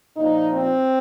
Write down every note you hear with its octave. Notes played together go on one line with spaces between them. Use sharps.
A#2 F3 D#4
C4